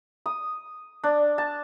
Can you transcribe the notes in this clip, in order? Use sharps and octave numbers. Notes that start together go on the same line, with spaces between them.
D#6
D4
A5